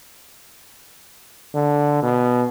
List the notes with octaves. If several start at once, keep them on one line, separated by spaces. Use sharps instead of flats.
D3
B2